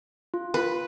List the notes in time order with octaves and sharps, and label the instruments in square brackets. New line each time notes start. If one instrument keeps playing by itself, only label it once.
[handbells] F4
[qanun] B4